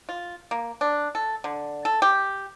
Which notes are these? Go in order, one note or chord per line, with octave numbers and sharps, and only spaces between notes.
F4
A#3
D4
A4
D3
A4
G4